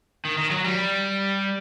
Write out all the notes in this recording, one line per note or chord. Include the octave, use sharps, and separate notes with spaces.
D#3
D#3
F#3
G3